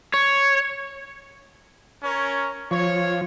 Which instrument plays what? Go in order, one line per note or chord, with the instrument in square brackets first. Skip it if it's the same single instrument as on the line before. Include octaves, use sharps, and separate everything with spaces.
[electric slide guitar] C#5
[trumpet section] C#4 A#4 C#5
[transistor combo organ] F3 [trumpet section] C#5